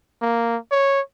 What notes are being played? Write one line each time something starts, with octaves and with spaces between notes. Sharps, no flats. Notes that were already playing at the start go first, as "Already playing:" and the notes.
A#3
C#5